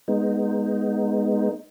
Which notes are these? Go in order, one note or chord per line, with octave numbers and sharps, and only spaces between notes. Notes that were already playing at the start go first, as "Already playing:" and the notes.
G#3 B3 D#4